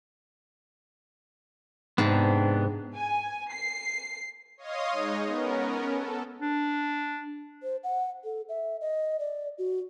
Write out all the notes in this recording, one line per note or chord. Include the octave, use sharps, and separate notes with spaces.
G#2 C3 B3 D4
G#5
C7
C#5 D#5 F5 C6 D#6
G#3 D#4 C#5 D#5
B3 C#4 A#4
A4
D4
C5
F#5
A4
E5
D#5
D5
F#4